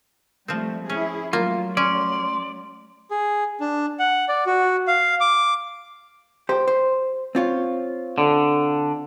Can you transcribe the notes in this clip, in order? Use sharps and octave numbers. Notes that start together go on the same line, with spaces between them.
F3 G3 A3 C4
C#4 E4 G#4
F#3 A3 A#3 F4
C#4 D5 C6
G#4
D4
F#5
D5
F#4
F5
D6
G4 C5
C5
C4 F4 C#5
D3